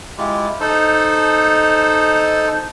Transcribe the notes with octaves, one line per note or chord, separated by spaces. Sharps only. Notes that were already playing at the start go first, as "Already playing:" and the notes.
G#3 E4 F4 G4
D#4 A4 C5